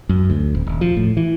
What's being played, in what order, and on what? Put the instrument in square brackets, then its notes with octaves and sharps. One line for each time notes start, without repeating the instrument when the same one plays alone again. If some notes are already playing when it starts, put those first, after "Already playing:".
[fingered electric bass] F#2
D2
D#1
D#1
F3
A2
E3